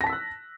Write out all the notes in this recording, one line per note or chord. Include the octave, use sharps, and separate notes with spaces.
A5 E6 F#6 A#6 B6